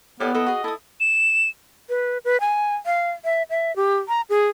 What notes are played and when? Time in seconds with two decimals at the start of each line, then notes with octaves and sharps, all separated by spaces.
0.20 A2 B3 G4 D5
0.35 E4 A4 D#5
0.46 F#4 G#4
0.64 E4 A4 D#6
1.00 E7
1.89 B4
2.25 B4
2.40 G#5
2.86 F5
3.25 E5
3.50 E5
3.76 G4
4.08 A#5
4.29 G#4